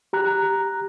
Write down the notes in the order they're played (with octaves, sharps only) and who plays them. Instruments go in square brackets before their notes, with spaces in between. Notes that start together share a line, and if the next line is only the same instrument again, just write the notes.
[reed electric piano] G4 A#5 F#6